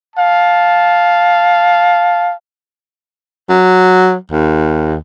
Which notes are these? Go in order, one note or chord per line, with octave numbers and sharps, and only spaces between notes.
F5 A5
F#3
D#2